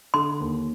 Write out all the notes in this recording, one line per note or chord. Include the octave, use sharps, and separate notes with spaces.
D3 C6
D#2